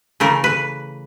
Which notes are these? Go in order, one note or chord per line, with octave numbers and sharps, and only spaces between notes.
C#3 E3 A3 A#4
B4